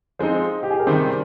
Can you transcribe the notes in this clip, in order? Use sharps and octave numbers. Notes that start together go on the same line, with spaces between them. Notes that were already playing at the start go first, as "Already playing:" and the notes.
F3 G#3 C4 D#4 C5
G4
G#4
A#4
C3 D#3 G3 C5